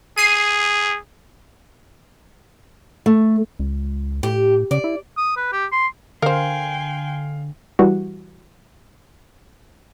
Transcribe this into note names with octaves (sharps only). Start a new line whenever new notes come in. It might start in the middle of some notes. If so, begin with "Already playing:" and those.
G#4 C7 D#7
A3
C#2
A2 G4
C#3 D5
E4
D#6
B4
G4
C6
D3 A#4 C5 F5 G5 G#5 C6
E3 G3 F#4